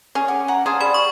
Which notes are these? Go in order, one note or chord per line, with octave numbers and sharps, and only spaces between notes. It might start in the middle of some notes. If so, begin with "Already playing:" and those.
C#4 G#4
F#5 G#5 D6
F#5 A#5
G#4 C5 F5 A5
G3 B5
C#6